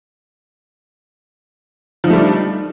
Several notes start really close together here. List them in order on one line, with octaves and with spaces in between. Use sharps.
F3 D#4 A3 G3 D4